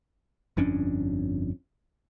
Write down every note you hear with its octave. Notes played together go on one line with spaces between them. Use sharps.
G1 F2 C#4 D4